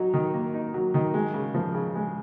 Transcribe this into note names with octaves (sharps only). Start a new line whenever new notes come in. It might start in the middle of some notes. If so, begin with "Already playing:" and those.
Already playing: F#3 D#4
D#3
A#3
D#4
F#3
D#3
G#3
C#3
F3
C#3
G#3